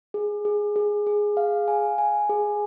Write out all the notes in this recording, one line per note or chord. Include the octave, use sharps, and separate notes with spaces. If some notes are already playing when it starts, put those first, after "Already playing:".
G#4
G#4
G#4
G#4
F5
G#5
G#5
G#4